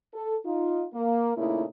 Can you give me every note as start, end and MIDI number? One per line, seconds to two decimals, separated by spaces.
0.14 0.36 69
0.46 0.84 63
0.46 0.84 65
0.94 1.36 58
1.36 1.64 46
1.36 1.64 49
1.36 1.64 57
1.36 1.64 58
1.36 1.64 63
1.36 1.64 64